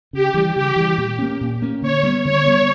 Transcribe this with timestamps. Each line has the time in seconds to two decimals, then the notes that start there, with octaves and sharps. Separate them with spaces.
0.13 C#3 G4
0.34 E3 G3
0.56 C#3 G4
0.76 E3 G3
0.98 A#2
1.19 A#3 C#4
1.41 A#2
1.62 A#3 C#4
1.82 D3 C#5
2.03 G3 B3
2.25 D3 C#5
2.45 G3 B3